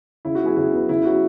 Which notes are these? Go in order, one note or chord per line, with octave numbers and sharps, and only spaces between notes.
C#3 E4
F#4
F#3 B3 E4 G#4
C#3 F#4
F#3 B3
C#3 E4
F#3 C#4 F#4